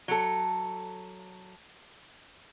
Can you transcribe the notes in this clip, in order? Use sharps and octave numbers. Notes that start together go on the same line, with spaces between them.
F#3 A4